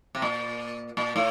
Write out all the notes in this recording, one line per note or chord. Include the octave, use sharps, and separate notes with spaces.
C3
A#2
A#2
A2